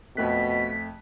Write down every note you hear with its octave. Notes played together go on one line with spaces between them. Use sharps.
F2 B2 A3 F#6 B6